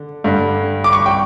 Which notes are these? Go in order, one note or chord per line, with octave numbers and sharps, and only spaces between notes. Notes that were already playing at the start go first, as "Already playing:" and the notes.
Already playing: D3
G2 D3 G3
D6
C#6
G5